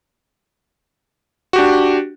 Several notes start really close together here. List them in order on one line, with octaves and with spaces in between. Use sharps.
F#4 G4 D4